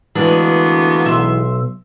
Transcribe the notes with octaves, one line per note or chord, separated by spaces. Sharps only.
D2 E3 G#3 A#3 B3 D4 G#4
B1 E5 C6